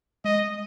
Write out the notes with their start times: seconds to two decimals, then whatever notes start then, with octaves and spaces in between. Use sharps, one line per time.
0.25 G#3 D#5